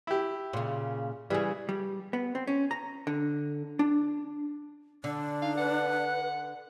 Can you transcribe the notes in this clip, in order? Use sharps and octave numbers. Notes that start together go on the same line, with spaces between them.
E4 G4
A#2 C#3
C#3 E3 G3 G#4
G3
B3
C4
C#4
A#5
D3
D4
D3 D4
D#4 F5
B4 F#5